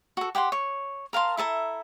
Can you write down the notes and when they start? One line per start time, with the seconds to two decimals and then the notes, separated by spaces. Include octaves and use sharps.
0.17 F#4 A4
0.35 G4 F#5 G5 C6
0.52 C#5
1.13 A#4 F5 A5 C6
1.37 E4 A4 E5 A#5